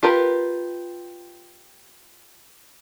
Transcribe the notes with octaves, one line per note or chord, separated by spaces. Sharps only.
F4 G4 A#4 B4